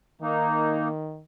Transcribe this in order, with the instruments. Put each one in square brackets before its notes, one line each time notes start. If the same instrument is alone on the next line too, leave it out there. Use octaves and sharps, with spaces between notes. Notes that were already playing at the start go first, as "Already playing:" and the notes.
[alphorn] D#3 [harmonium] A#3 D#4